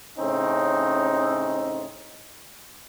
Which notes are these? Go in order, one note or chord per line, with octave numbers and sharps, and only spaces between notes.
A2 C#3 C4 C#4 D#4